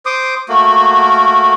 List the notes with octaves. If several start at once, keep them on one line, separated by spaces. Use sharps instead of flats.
C5 C6 D6 D#6
A3 A#3 F#4